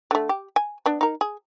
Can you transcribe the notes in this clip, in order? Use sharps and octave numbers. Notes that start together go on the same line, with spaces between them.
D3 A3
G4
G#5
B3 D4
D#4 A#4
G#4